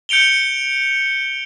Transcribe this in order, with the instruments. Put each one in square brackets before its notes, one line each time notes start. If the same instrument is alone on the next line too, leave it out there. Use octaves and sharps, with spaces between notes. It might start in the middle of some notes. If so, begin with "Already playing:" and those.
[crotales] G6 C#7 D7 F7 G7